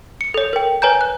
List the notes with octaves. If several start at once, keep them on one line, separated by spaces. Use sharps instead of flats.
C#7
A4 C#5
A#4 G5
B4 C#5 G#5 A#5 G6
F#6